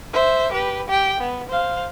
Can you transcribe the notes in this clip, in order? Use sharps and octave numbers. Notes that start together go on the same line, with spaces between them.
C5 E5
G4 B4
G4 G5
B3
C5 F5